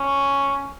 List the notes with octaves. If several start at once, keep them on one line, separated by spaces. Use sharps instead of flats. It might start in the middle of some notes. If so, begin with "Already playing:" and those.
Already playing: C#4